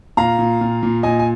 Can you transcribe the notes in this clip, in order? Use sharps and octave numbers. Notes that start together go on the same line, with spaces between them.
A#2 F5 A#5
A#2
A#2
A#2
A#2 D#5 G#5
G#5